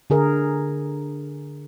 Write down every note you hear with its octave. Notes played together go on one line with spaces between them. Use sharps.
D3 G#4 A#4